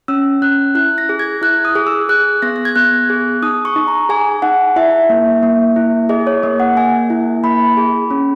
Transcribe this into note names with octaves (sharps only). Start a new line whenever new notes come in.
C#4 E6
C#4 F#6
E4 F#6
A#6
G#4
G#6
E4 F#6
D#6
G#4
E6
G#4 F#6
B3 A#6
A#6
G#6
B3 F#6
G#4
D#4 D#6
C#6
D#4
A#5
G#4 G#5
D#4 F#5
E4 E5
A#3
A#3
E4
G#4 D#5
C#5
A#3 D#5
F#5
A#3 G#5
E4
A#3 B5
G#4
C#4